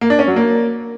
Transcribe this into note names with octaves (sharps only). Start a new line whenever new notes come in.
A#3
D4
C#4
F#3
A#3